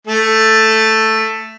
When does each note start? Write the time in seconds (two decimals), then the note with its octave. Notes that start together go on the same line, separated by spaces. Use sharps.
0.07 A3 A4